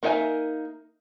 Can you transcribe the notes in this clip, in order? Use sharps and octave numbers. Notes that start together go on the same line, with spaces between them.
A#3 D#4 A#4 E5 G#5